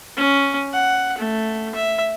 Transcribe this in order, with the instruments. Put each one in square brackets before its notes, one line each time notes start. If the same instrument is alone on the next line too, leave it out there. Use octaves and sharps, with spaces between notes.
[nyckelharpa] C#4
F#5
A3
E5